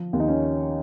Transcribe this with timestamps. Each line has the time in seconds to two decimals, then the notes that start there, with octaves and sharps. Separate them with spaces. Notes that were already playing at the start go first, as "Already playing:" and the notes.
Already playing: F3
0.13 D#2
0.20 D#4
0.28 C#4